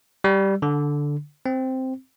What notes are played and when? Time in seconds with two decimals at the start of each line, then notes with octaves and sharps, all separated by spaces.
0.24 G3
0.62 D3
1.46 C4